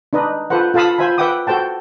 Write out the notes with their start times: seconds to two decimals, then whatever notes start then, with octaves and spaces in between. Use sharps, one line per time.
0.13 D4 D#4 B4 D#5
0.50 F4 A4 B4 C5 F#5
0.74 F4 A4 F5 A5 B5 D#6
0.98 F4 C5 E5 G#5 B5
1.18 B4 E5 F#5 G5 D6 D#6
1.47 F#4 A4 C5 G5 A5